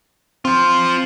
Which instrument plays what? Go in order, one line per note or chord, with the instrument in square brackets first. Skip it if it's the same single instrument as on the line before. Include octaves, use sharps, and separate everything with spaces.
[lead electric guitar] F3 F4 [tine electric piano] C4